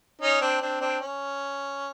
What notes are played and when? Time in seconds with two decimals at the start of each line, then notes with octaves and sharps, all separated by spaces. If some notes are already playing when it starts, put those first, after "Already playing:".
0.22 C#4 D#4
0.41 C4 D4
0.61 C4 D4
0.81 C4 D4
1.01 C#4